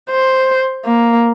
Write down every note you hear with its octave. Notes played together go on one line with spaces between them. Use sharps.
C5
A#3